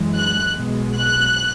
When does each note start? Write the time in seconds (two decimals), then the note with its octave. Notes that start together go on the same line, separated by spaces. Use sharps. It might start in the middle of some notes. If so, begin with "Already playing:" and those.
Already playing: F#2 E3 G#3
0.14 F#6
0.55 B1 B2 G#3
0.96 F#6